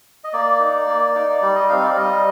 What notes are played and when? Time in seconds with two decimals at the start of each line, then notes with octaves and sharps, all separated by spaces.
0.24 D#5
0.33 A#3 D5
0.60 D#4
0.87 A#3
1.15 D#4
1.41 G3 D5
1.56 D#5
1.69 C4 D#4 F5
1.83 D5
1.90 F5
1.97 G3 D#5